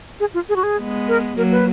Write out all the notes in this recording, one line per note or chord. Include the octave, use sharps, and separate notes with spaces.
G#4
F4
G#4
F#4
G#4
G#3 B3
A#4
F#3 A#3 A#4
B4